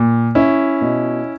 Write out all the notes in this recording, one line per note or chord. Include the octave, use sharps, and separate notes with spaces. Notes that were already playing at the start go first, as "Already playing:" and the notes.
Already playing: A#2
C#4 E4
B2